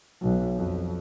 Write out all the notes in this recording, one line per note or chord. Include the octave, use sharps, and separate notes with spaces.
B1
F2